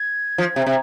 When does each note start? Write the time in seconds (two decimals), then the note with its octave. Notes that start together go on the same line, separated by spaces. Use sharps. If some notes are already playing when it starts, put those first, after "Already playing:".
Already playing: G#6
0.38 F3
0.56 C3
0.67 C3